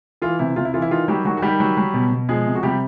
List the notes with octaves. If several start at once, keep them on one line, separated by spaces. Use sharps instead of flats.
E3 F4
C3 E4
C3 F4
E4
E3 F4
E4
D#3 F4
F#3 G3 G4
D#3 F#3 F#4
F#4
D#3 G3 G4
F#3
F#3
B2
B2
F3 G#3 G#4
C3
F#4
C3 G3 G4